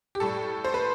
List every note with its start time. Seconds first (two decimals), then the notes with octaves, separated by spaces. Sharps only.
0.15 G4
0.20 A2 G3 A4
0.65 C5
0.74 B4